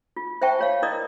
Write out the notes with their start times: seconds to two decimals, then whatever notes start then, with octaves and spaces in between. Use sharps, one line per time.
0.16 F4
0.41 C5 E5 F#5 G5 A5 C#6
0.59 F4 C#5 F5
0.82 E4 A#4 D5 D#5 D#6